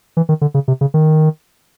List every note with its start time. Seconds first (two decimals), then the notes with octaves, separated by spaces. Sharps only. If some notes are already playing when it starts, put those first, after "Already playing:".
0.17 E3
0.29 D#3
0.41 D3
0.54 C#3
0.68 C3
0.81 C#3
0.94 D#3